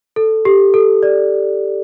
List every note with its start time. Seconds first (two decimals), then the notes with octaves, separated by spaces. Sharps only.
0.16 A4
0.45 G4
0.74 A4
1.03 D5